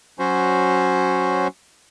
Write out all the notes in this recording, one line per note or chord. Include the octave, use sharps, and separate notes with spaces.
F#3 C#4 F#4 C5